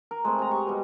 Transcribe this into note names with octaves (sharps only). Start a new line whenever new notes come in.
A#4
G#3 A3 C4
C3 A#5
D#5 C#6
B2 G3